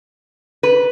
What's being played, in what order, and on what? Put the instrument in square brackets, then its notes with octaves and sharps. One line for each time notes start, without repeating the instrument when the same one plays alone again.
[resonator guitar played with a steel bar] B4